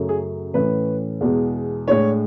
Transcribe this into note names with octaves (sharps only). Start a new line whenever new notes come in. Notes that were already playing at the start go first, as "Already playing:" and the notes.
Already playing: F#2 C#3 F#3 A3
G#4
A2 E3 A3 C#4 B4
E2 B2 G#3
A2 G#3 D4 C#5